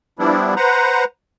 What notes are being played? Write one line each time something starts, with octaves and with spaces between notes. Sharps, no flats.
F3 G3 B3 D4 E4
B4 C5 F#5 A#5